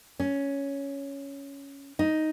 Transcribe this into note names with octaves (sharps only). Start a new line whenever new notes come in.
C#4
D#4